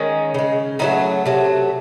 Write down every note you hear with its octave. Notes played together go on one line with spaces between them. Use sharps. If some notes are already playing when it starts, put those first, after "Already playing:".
Already playing: D#3 G#3 C#4
C#3 G#3
C#3 F#3 A3 D#4
C3 F#3 A3